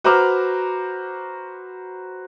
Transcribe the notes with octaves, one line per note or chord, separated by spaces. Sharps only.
F#4 B4 C5 A#5 D6 F6